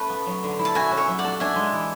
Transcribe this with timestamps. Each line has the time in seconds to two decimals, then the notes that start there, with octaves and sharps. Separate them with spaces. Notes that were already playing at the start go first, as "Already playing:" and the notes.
Already playing: A3 C#4 B4 A5
0.10 B3
0.26 F#3
0.43 D3
0.59 E4
0.65 A5
0.75 F#4 E5 G#5
0.91 C#4
0.97 C#5 E5
1.08 F#3
1.19 D5 F#5
1.24 A4
1.40 D4 E5 G#5
1.56 G#3
1.73 E3